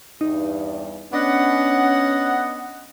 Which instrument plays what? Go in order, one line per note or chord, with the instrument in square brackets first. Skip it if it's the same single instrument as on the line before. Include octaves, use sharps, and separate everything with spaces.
[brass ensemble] E2 G2 [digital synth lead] D#4
[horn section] B3 D#5 F#5 [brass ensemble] C#4 [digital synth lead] D4